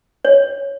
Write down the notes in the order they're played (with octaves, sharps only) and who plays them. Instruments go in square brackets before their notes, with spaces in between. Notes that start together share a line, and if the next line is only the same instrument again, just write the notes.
[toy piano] C#5